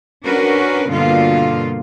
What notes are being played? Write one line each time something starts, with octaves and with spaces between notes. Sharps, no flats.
C#4 D4 F#4 A#4 B4
G2 B2 D3 A#3 F4